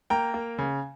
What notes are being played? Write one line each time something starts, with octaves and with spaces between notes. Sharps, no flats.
A#3 G5 A#5
A#3
C#3